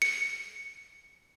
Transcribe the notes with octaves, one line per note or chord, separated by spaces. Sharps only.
C#7